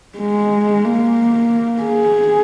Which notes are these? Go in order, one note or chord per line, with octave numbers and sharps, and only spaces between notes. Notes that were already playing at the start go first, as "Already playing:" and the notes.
G#3
A#3
G#4